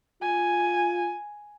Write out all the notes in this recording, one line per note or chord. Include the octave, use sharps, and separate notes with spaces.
F4 G#5